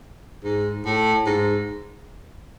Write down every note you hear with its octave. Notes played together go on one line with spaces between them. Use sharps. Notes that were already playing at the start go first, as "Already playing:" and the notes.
G#2
A2
G#2